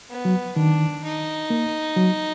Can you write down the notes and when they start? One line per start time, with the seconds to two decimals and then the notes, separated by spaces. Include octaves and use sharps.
0.09 B3
0.25 F#3
0.56 D#3 D4
1.04 D#4
1.50 A#3
1.96 F#3